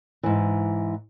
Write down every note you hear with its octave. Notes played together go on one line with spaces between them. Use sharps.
G#2 E3